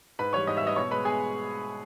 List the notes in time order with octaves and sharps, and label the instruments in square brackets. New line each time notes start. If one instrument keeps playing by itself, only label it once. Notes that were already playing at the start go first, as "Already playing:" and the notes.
[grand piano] G#2 B4 B5
E3 G3 C#5 C#6
G#2 D#5 D#6
E5 E6
E3 G3 D#5 D#6
B2 C#5 C#6
G#3 B4 B5
B2 G#4 G#5